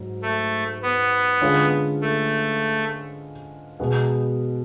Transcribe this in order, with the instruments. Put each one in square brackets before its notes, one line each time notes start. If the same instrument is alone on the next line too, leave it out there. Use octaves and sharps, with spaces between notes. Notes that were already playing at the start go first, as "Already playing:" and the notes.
Already playing: [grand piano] G#2 F#3
[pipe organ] A3
B3
[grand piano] D3 G#3 C#4 F4 B4
[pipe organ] A3
[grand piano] B2 G#3 B3